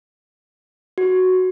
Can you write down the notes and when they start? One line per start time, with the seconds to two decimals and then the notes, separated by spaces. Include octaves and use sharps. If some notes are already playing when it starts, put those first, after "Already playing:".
0.98 F#4